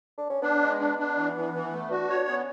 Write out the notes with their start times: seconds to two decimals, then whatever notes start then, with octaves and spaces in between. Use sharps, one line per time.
0.18 D4
0.30 C#4
0.42 B3 D4
0.61 G#3
0.79 D4
0.99 D4
1.17 E3
1.36 E3
1.54 E3
1.72 A3
1.90 D4 F#4
2.10 C#5
2.28 B3 C#4